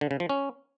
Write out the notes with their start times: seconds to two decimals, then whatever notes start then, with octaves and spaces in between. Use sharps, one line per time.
0.01 D3
0.11 C#3
0.20 F3
0.29 C#4